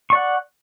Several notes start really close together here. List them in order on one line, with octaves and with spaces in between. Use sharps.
C#6 D5 F#5